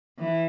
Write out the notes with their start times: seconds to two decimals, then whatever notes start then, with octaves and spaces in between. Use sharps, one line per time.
0.19 E3